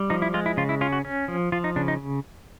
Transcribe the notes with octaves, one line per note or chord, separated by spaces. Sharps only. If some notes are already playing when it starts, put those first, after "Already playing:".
Already playing: G3
F3 D#4
E4
G#3 F4
E4
C#3 F4
E4
C#4 F4
F#4
C#4
F3
F3 F4
D#4
C#3 D4
D#4